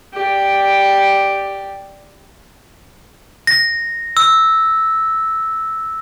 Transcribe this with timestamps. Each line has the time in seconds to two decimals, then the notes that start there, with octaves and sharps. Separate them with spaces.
0.13 G4 D5
3.47 A#6
4.17 E6